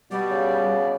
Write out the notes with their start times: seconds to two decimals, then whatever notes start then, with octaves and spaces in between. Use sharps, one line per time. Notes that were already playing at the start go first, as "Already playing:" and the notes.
0.11 B2 G3 B3 D5
0.31 C#3